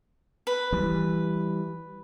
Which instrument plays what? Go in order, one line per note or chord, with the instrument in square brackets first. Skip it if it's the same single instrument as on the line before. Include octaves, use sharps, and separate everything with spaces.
[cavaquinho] B4
[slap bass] E3 G3